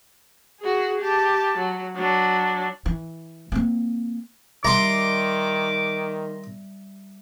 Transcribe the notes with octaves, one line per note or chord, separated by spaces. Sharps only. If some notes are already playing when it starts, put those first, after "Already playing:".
F#4 G#4
G4 A5
F#3
F#3 D4
E3
A#3 C4
D#3 G3 E5 A#5 C6 D6